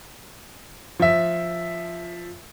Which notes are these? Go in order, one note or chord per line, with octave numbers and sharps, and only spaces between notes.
F3 E5